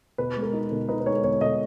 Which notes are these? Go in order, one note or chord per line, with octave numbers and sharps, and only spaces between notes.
B2 B4
G#3
A#4
D#4
B2
D#4 B4
B4
G#3 C#5
B2 C#5
B2 D#5